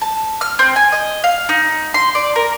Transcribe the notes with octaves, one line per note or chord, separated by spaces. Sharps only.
A5
F6
C4
G#5
D#5
F5
D#4
C6
D5
A#4